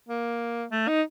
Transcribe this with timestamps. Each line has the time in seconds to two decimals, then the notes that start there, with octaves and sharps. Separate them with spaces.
0.08 A#3
0.71 A3
0.88 D#4